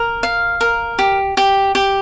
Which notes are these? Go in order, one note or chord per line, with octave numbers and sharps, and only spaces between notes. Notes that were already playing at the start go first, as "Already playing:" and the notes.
Already playing: A#4
F5
A#4
G4
G4
G4